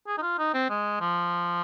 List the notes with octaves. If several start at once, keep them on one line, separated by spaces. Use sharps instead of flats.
G#4
D#4
F4
D#4
C4
G#3
F3